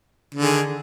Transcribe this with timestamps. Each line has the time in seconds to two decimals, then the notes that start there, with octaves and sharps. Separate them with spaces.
0.34 D3
0.38 D#3
0.42 G#4